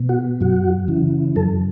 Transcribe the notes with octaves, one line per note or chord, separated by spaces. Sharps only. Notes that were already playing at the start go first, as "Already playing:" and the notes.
Already playing: B2
F#4
F#2 F#4
C#3 E3
F#2 A4